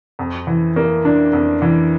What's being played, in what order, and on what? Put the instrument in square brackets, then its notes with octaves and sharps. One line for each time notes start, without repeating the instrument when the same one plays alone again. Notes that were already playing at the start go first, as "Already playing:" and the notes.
[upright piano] F2
E3
A#3
D4
F2
E3